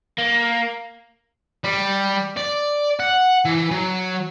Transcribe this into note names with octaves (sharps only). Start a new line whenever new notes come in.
A#3
G3
D5
F#5
E3
F#3